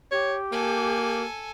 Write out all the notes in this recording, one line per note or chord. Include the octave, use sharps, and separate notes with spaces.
G4 C#5
A#3 A4 G#5